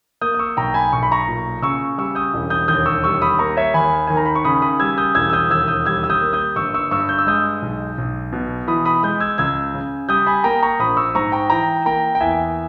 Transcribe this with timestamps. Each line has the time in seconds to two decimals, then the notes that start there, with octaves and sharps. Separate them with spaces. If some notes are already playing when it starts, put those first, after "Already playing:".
0.21 A#3 D#6 G6
0.34 D#6
0.39 C#6 E6
0.57 B1 G5 A#5
0.74 G#5 B5
0.93 B1 C#6
1.03 B5
1.12 A#5 C#6
1.28 A#2
1.62 C#3 C#6 E6
1.97 G3 C#6 E6
2.15 D#6 G6
2.34 E1
2.50 D#6 G6
2.68 D#2 D#6 G6
2.86 C#6 E6
3.04 G3 C#6 E6
3.22 B5 D#6
3.39 A#3 A#5 C#6
3.57 C#5 E5
3.74 D#2 G#5 B5
4.07 D#3 G#5
4.17 A#5
4.25 B5
4.35 C#6
4.45 C#3 B5 D#6
4.62 B5 D#6
4.80 G3 E6 G#6
4.98 D#6 G6
5.15 E1 E6 G#6
5.30 E6
5.33 D#6 G6
5.50 D#2 E6 G#6
5.68 D#6 G6
5.85 G3 E6 G#6
6.04 E6
6.10 D#6 G6
6.22 A#3
6.33 D#6 G6
6.56 G1 C#6 E6
6.74 C#6 E6
6.91 G2 C#6 E6
7.09 G6
7.19 E6
7.26 G#3 D#6 G6
7.62 B1
7.98 B1
8.33 B2
8.68 E3 B5 D#6
8.85 B5 D#6
9.03 G#3 D#6 G6
9.20 E6 G#6
9.38 C#2 E6 G#6
9.74 C#3
10.09 G3 D#6 G6
10.26 G#5 B5
10.44 A#3 G5 A#5
10.63 A#5 C#6
10.79 A#1 B5 D#6
10.97 C#6 E6
11.15 G#2 A#5 C#6
11.32 G5 A#5
11.50 E3 G5 A#5
11.86 A#3 G5 A#5
12.15 G5
12.20 E2 E5 G#5